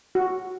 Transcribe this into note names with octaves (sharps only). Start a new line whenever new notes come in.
F#4